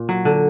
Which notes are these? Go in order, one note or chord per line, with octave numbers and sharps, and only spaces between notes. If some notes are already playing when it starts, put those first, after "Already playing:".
Already playing: A#2
F#3
D3